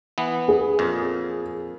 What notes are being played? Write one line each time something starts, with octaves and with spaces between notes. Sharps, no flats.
E3 B3
G#4
F2 A#2